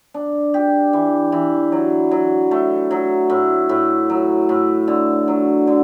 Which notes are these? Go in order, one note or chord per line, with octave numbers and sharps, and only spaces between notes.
D4
G4
E3
E3
F#3
F#3
A3
F#3
A2
A2
F#3
A2
D3
F#3
D3